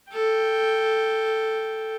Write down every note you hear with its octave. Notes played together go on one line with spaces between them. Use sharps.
A4 G5